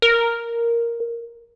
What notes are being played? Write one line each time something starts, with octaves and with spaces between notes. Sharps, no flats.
A#4